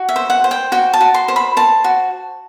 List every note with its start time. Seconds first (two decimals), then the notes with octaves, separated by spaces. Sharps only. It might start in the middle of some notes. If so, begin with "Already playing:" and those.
Already playing: F#4
0.09 E5
0.16 C5
0.30 F#5
0.44 C5
0.51 G5
0.72 F#4 G5
0.93 A5
1.01 F#4
1.14 C6
1.28 C5
1.36 B5
1.57 C5 A5
1.84 F#4